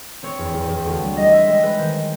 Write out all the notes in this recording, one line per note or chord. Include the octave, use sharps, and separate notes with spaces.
C4 C#5
E2
E2
E2
D2
G3
G3 D#5
C4 E5
G#3 D#5
G#3 B4
D#3 C5